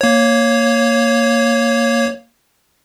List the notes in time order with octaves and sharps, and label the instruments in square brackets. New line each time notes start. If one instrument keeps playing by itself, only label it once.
[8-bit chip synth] A#3 C#5